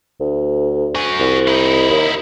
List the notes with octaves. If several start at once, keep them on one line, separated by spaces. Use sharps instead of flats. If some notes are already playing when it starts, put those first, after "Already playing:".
D2
F#4 G#5
C2
D#4 E4
D#2